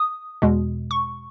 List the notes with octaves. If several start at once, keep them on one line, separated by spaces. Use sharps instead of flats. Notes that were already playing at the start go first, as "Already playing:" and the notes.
Already playing: D#6
E2 B2 G#3
C#6